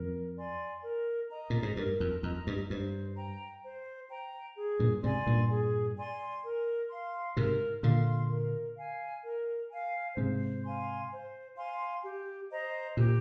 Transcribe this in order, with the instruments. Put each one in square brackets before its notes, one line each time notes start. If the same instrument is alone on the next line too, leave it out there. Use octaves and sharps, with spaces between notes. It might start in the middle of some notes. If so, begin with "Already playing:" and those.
Already playing: [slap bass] F2 [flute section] A#4
[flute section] D5 G#5 C6
A#4
D#5 A#5
[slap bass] A#2
G#2
[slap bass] G2 [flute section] A#4
[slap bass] F2
[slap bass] F2 [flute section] D#5 A#5
[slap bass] G2
[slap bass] G2 [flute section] C5
[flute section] G5 A#5
C5
G5 A#5
G#4
[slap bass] G2 A#2
[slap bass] G#2 C3 [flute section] D5 G#5 C6
[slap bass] G2 A#2
[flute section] G#4
D5 G#5 C6
A#4
F5 C6
[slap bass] G#2 C3 [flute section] A#4
[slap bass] A#2 D3 [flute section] F5 C6
[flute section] A#4
F5 G#5
A#4
F5 G#5
[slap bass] G#2 C3 [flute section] C5
[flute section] F5 G#5 C6
C5
F5 G#5 C6
G4
C5 D#5 A#5
[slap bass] A#2 [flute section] G4